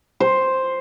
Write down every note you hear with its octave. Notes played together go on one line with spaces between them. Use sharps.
C5